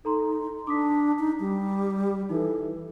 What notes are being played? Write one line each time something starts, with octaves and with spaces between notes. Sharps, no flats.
D#4 A4 A#5 C6
D4 D6 D#6 B6
D#4
G3
E3 D#4 A4